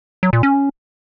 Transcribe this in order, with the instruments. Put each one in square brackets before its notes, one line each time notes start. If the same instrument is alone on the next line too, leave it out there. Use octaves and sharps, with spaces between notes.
[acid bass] F#3
A#2
C#4